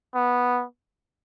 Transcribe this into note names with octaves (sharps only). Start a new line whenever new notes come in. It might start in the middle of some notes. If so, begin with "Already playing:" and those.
B3